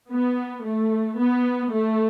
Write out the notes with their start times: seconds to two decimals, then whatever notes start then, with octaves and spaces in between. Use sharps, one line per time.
0.12 B3
0.65 A3
1.19 B3
1.73 A3